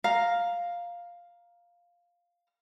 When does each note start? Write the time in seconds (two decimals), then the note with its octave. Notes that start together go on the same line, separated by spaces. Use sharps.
0.04 F5 A#5